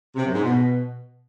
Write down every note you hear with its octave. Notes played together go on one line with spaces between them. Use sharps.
C3
F#2
G#2
B2